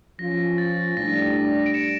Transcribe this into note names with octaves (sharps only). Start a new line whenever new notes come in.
F3 C#4 F4 A#6
A6
A2 G3 D4 A#6
D7
C#7 E7